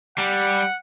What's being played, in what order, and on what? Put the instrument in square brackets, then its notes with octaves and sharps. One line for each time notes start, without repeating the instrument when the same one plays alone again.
[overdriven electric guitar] G3 [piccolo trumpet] F#5